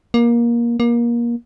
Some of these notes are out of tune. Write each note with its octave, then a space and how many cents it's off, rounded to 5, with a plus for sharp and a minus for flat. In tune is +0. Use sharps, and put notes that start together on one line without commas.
A#3 +20
A#3 +25